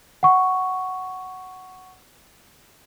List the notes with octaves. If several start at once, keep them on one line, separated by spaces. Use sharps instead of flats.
F#5 C#6